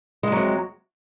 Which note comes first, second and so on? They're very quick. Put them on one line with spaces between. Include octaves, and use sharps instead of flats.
G#3 F2 F#3 C3